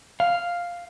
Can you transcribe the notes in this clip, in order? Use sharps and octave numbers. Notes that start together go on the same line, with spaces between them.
F5